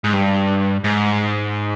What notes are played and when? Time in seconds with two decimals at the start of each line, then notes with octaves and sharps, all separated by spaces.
0.04 G#2
0.13 G2
0.84 G#2